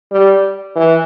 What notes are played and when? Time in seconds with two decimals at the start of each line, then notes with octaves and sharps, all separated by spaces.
0.12 G3
0.76 E3